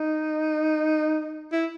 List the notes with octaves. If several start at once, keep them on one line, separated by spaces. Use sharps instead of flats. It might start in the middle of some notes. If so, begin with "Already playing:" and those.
Already playing: D#4
E4